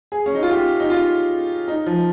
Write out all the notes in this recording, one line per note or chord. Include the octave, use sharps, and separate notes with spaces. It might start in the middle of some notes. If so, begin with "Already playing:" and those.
G#4
C#4
D#4
F4
G4
D#4
F4
D#4
F3